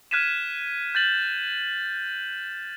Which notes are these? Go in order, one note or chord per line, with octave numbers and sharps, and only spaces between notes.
F6 F#6 G#6 B6 D#7 E7
G6 A6 F#7